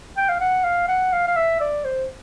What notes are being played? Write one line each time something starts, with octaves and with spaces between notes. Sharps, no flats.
G5
F5
F#5
F5
F#5
F5
F5
E5
D5
C5